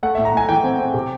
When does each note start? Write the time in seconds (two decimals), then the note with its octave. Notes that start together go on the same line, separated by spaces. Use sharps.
0.03 A3 F#5
0.15 A2 E5
0.25 A#5
0.34 A2 G#5
0.49 E3 G5
0.64 C4
0.79 C4
0.94 C3